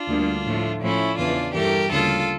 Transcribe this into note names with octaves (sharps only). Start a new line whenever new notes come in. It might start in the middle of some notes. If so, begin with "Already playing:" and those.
Already playing: D4 F4
D2 D3 G3 A#3
A2 F3 A3
A2 F3 A3 C#4 E4
E2 C#3 E3 D4 F4
G2 E3 A3 G4 A#4
D2 C#3 G3 A#3 F4 A4